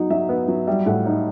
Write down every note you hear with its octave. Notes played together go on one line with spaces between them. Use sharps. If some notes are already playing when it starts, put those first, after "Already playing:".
Already playing: F#3 B3 D#4
F#3 E5
B3
F#3
G3 E5
A2 F#5
D#4